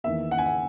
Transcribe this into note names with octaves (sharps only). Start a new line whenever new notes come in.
E2 D#3 A#3 E5
F#5
G#5
F#5